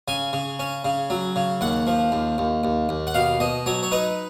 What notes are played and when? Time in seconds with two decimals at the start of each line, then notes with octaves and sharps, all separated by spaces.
0.08 C#3 G#5
0.33 C#3
0.59 C#4
0.85 C#3
1.10 F#3
1.36 C#3
1.61 D#2 F#5
1.87 F3
2.12 D#2
2.38 D#2
2.64 D#2
2.89 D#2
3.07 F#5
3.14 B2 F5
3.40 B2 D#5
3.66 F#3 C#5
3.83 C#5
3.92 D#4 B4